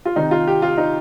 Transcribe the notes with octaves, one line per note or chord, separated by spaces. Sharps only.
F4
C3 D#3 D#4
F4
G4
F4
D#4